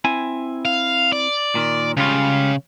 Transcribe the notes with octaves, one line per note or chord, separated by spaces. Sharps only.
C4 E4 G#5
F5
D5
A#2 D#3
C#2 C#3 G3 F4